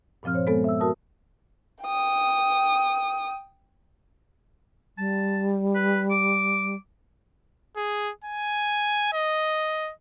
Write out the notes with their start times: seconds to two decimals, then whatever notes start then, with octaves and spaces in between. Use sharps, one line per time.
0.23 G2 A#2 F3 C4 F6
0.34 C5 C#5
0.47 G#3 B3 A4
0.64 E5 E6
0.80 F#4 A#4 A5 D#6
1.83 G5 D#6
4.98 G3 A5
5.75 B4
6.10 D6
7.77 G#4
8.25 G#5
9.14 D#5